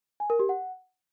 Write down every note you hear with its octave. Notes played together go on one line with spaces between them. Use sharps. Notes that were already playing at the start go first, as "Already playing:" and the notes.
G#5
A#4
G4
F#5